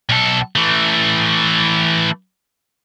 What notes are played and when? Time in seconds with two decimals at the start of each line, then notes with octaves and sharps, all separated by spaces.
0.09 B1 A4
0.56 E3 A3